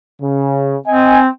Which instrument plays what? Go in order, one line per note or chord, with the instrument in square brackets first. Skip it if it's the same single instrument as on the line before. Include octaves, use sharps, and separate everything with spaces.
[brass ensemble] C#3
[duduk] C4 [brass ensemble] D#5 G#5